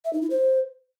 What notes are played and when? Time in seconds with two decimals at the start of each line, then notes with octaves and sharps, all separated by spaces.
0.05 E5
0.13 D#4
0.22 E4
0.30 C5